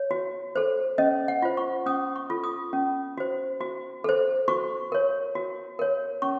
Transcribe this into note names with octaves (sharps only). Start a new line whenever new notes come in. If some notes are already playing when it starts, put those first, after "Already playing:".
Already playing: C#5
F#4
A4 C5
C#4 D#5
F#5
F4 C5
C#6
C#4 D#6
C#6
F4 A4
D#6
C#4
F#4 C5
F#4
A4 C5
F#4 C#6
A#4 C#5
F#4
A#4 C#5
C#4 C#6